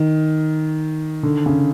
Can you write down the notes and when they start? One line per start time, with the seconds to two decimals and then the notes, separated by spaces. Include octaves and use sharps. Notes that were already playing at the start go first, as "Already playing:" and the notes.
Already playing: D#3
1.23 D3
1.46 C#3